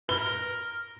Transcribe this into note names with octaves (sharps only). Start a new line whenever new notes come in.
A#4 B4 G7